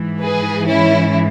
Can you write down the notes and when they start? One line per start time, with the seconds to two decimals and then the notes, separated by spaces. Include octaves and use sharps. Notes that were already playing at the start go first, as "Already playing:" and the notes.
Already playing: G#2 E3
0.22 G#4 B4
0.68 C#4 E4